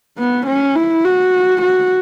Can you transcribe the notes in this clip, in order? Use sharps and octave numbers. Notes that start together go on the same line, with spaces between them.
B3
C#4
E4
F#4
F#4